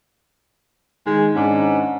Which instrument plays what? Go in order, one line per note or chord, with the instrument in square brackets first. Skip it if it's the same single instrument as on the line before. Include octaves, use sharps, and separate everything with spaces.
[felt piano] D#3 [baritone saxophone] G#3
[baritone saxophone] G#2 [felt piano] C#4 D4